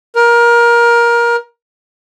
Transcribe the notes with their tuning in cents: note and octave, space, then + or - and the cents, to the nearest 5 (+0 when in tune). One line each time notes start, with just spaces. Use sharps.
A#4 +20